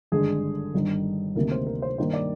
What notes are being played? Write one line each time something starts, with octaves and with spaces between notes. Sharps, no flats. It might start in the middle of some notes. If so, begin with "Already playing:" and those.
G#1 G2 D3 G#3 G#4
G1 G2 D#3
D2 C3 D#3 A#3 A#4
C5
A#4
C5
G2 D#3 A#3 C5
D5